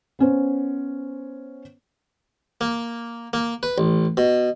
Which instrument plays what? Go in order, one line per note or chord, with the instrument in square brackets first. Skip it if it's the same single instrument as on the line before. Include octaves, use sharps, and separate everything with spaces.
[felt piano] B3 C#4 C5
[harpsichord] A#3
A#3
B4
A1
B2